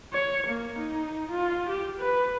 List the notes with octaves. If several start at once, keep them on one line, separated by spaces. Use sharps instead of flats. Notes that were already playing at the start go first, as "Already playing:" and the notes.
C#5
A#3
D#4
F4
G4
B4